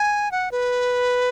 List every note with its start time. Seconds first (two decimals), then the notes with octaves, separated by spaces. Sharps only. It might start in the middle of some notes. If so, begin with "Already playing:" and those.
Already playing: G#5
0.32 F#5
0.52 B4